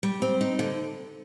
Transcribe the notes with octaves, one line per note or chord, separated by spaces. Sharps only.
G3
C4
D#4
D3